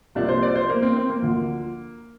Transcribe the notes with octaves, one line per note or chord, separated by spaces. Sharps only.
C2 C3 F3 A#3 D4
C5
D5
C5
A#3
C4
C4
A#3
D2 D3 F3